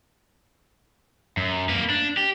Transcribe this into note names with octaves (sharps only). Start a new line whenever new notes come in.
F#2
A#3 B4
D4
G4